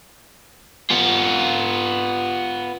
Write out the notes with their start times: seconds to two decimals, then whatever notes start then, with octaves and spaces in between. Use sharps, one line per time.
0.91 B3 F4